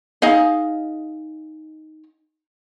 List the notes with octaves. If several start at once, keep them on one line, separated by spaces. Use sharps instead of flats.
D#4 G#4 D#5 F5